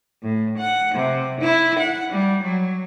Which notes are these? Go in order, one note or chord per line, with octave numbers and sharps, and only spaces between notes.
A2
F#5
C3
E4
F#5
G3
F#3